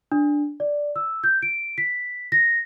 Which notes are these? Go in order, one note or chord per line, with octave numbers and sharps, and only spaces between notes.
D4
D5
E6
G6
D7
B6
A#6